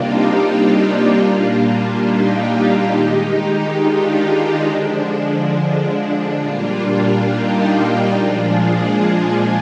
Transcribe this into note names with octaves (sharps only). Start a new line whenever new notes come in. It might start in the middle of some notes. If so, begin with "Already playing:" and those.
Already playing: C3 G3 A#3 D4 D#4 F4 G4
D#4 G4
A#2 G3 A#3 D4 F4
D4 F4
D4 F4
D#4 G4
D#3 G#3
D4 F4
D3 F3 G#3 D4
A#2 G3 A#3 D4 F4
D#4 G4
A#2 F3 G#3 D4 F4
F4 G#4